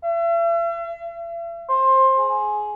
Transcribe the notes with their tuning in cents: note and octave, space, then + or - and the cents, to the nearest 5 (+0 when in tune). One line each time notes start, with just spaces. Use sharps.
E5 +45
C5 +20
G#4 +15